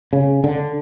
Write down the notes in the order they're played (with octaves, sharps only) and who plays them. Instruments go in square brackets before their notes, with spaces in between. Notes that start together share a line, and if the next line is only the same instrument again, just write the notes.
[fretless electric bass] C#3
D3